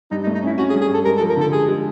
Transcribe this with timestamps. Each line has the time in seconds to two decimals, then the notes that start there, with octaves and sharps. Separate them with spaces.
0.11 G2 D#4
0.23 D#4
0.27 A3
0.34 D#4
0.43 C#4 E4
0.58 C#4 F#4
0.70 G#4
0.74 G2
0.81 G#4
0.89 G2 A4
1.05 G#3 A#4
1.17 A4
1.21 F3
1.29 A#4
1.37 D3 A4
1.52 G#3 G#4
1.68 G#3